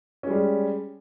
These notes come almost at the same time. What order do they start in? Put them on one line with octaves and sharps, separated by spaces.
C#4 G#3 G3